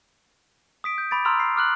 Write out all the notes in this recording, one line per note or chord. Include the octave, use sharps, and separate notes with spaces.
D#6 B6 D7
G6
B5 D6 A6 D7
A#5 C6 E6 F6 F7
C7
D6 F6 F#6 F#7